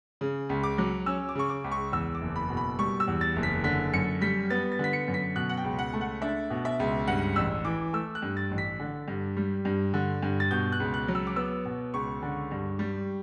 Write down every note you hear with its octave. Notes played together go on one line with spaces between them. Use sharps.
C#3
C#2
D6
F#3
C#4 E6
D6
C#3 C#6
D6
C#2
C#6
E2 E6
D6
F#1
B5
B2
B5
G3 C#6
E6
E2
A6
F#1
B6
D3 B6
F#2 C#7
G3 B6
B3 A6
A6
D3 B6
C#7
F#2
B6
B2 F#6
F#5
G5
C#2
F#5
A3
F#5
D4 E5
B2
E5
C#2
G2 F#5
A1 E6
E3 D6
A3 E6
F#6
G2
A6
A1
B6
D3
G2
G3
G2
D3
G2
A6
B2 G6
F#6
C#2
F#6
F#3
E6
D6
B3 E6
B2
C#2 C#6
D3
G2
G3